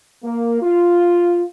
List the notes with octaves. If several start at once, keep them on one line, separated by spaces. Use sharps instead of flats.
A#3
F4